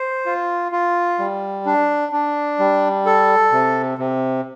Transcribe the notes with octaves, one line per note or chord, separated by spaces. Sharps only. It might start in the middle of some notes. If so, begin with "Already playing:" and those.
Already playing: C5
F4
F4
G3
D4
D4
G3
A4
C3
C3